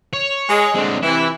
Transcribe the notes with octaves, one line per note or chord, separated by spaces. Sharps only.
C#5
G#3
D3 G#3 C4 D4
C3 E3 E4